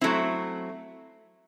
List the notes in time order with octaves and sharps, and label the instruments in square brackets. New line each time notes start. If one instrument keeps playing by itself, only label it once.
[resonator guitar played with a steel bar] F#3 A3 C4 E4